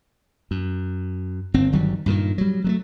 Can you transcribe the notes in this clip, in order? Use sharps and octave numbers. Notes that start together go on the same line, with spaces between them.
F#2
G1 C4
G1 D#3 F#3 G3
G2 A#2 D3 D#3
F#3 G3
F#3 G#3 A3